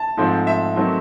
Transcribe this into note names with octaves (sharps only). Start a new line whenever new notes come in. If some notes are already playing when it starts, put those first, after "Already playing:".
Already playing: A5
G#2 F3 A3 C4
E5
D#3 F#3 A3 C4